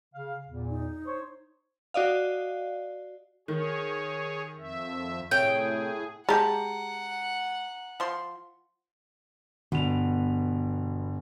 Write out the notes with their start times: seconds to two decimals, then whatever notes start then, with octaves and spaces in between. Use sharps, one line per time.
0.13 C#3 F5
0.47 E2 A#2
0.70 D#4
1.05 C5 C#5
1.94 F#4 D5 D#5 F5
3.48 D#3 A#3 G#4 C#5
4.58 F2 E5
5.31 A2 C3 G#4 C#5 E5 G5
6.29 G#3 G4 F#5 A5 A#5
8.00 F3 C6
9.72 G1 B2 F7